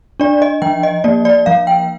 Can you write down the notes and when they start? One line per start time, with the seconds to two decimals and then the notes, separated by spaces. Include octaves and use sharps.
0.20 D4 D5
0.42 D#5
0.62 F3 G5
0.83 D#5
1.04 A#3 D5
1.25 D5
1.46 F3 F5
1.67 G5